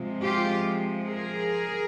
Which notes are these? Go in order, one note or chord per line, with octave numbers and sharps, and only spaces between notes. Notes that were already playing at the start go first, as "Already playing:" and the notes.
Already playing: C3 F3 G#3
F4 G4
G#4 A#4